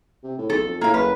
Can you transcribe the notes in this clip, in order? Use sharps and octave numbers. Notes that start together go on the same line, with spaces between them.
C3
A2
B1 A4
F2
A2 A#3 F5
F#1 B4